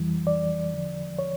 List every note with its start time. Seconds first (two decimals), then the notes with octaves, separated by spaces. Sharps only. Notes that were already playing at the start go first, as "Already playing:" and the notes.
Already playing: F2 E3 G3
0.27 D5
0.73 E2 D3 F3
1.19 C#5